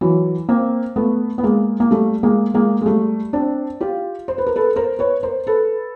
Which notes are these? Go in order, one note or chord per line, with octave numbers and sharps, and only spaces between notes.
E3 F#3
A#3 C4
A3 B3
B3
G#3 A#3
A#3
G3 A3
G#3 A#3
G#3 A#3
G#3
G3 A3
C4 D4
F4 G4
C5
B4
A#4
A4 B4
A#4 C5
B4 C#5
A#4 C5
A4 B4